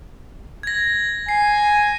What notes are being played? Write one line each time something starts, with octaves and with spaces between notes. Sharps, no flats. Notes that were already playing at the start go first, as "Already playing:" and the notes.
G#6 A#6
G#5 C7